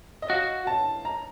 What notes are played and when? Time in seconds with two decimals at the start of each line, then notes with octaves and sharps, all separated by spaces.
0.22 D#5
0.30 F#4 F5
0.67 A5
1.05 A#5